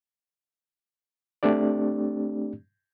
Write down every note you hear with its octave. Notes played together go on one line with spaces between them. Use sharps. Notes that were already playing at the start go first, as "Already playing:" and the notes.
A3 C4 D4 G4 D5